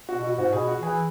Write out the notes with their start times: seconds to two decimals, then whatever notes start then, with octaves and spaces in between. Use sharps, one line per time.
0.09 F#4
0.16 B2
0.23 F#4
0.37 G#2 F#4
0.53 B2 G#4
0.68 F#4
0.82 E3 G#4